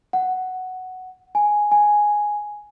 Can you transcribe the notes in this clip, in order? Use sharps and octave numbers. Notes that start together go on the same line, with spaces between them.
F#5
G#5
G#5